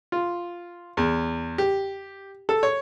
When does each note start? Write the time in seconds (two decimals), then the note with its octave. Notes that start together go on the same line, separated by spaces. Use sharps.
0.12 F4
0.97 E2
1.58 G4
2.49 A4
2.63 C#5